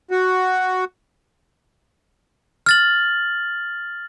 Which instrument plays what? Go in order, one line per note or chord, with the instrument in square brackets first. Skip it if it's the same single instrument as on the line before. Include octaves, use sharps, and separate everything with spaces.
[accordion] F#4
[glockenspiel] F6 A6 F#7